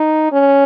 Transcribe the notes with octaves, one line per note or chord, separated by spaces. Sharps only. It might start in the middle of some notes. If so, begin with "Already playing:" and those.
Already playing: D#4
C#4